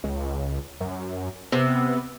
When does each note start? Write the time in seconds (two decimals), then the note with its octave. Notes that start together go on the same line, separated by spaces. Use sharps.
0.04 C#2
0.80 F#2
1.52 C3 B3